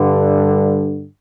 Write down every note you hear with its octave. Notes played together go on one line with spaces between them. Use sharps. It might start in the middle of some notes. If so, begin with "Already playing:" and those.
Already playing: G2 D3